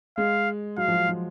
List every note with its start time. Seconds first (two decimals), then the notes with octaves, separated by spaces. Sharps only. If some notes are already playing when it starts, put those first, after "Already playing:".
0.17 G#3 F5
0.77 F#3 F5
0.88 F3
0.94 F#3
1.09 F3